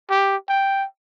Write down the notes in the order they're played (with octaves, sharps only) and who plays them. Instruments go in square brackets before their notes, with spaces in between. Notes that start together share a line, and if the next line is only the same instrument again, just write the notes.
[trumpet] G4
G5